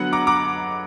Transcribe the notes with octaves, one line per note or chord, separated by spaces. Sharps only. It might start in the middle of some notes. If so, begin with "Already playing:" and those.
Already playing: D3 F#3 B3 F#5
A#5 D6
A#5 D6